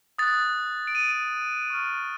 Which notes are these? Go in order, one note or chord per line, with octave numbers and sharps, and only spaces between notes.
D#6 F#6 A6
D7
D#7
C#6 F6